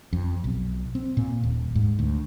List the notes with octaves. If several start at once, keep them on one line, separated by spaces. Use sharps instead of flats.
F2
B1
C4
A#2
D#1
G#2
D2